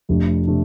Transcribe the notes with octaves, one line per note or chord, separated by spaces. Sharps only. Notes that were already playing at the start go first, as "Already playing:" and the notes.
F1 F2 C3 A3 D4
C3 A3 D4